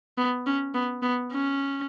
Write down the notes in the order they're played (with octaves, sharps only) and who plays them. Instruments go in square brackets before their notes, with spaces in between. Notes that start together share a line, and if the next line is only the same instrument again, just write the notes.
[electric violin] B3
C#4
B3
B3
C#4